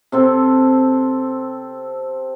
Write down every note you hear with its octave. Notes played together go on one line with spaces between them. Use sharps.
C3 C4 A4